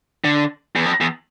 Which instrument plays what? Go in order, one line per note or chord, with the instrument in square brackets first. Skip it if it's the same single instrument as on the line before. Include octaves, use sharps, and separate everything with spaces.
[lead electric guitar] D3
E2
F2
E2